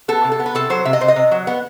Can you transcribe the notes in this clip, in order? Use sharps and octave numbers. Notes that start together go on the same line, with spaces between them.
B3 A4
C3
A4
B3
B4
C3 A4
F#3 C5
C3 E5
D#5
C3 C5
D#5
C3
F#3
B3 F#5